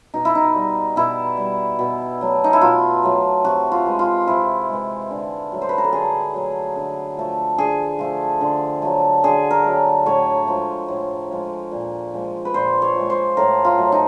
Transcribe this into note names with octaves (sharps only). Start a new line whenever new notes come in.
B2 D#4
E4
D#4
G3
B2 E4
G3
B2
F#3 A3
D#4
E4
B2 F4
F#3 A3
C3 F#4
F4
E3 G#3
F4
C3 E4
E3 G#3
D3
F#3 A3
C5
B4
A#4
A4
D3 G#4
F#3 A3
D3
F3 A3
D3 G#4
F3 A3
D3
F#3 A3
D3 G#4
A#4
F#3 A3
A2 C#5
F3 G#3
A2
F3 G#3
A#2
F3 G#3
B4
A#2 C5
C#5
F3 G#3
C5
A2 A#4
F4
F#3 A3
D#4